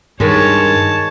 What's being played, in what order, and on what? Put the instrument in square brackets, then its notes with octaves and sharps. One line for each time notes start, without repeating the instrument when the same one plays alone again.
[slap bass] G2 [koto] D#3 G#3 [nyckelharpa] C#5 A5